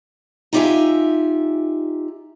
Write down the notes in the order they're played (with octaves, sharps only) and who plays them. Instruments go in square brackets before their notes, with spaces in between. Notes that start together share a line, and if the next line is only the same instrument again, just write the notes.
[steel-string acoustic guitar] D#4 F4 G4 C#5 E5 G#5